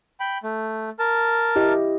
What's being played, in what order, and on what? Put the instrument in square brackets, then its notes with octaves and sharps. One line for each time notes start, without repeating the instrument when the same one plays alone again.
[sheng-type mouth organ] G5 B5
A3
A#4 A5
[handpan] E4 G4 D#5